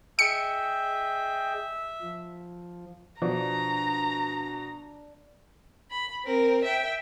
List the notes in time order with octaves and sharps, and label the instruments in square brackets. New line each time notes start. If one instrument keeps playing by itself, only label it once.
[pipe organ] G#4 D#5 G5 [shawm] E5 [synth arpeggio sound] C#7
[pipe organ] F3
[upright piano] B2 [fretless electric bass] F3 [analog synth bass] D4 [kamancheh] A#5
[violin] B5
C4 A#4
E5 G5